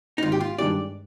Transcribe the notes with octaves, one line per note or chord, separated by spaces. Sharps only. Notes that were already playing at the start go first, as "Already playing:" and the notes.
D#4
G#1 G#2 D#3 F4
G4
F4
G2 D#3 G#3 D4 G4 D5